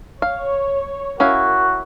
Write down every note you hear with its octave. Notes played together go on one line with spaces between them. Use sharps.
C#5 F5
C#4 E4 F#4 A#4 F5